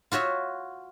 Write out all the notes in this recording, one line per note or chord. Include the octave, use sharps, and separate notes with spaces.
F4 F#4 C#5 E5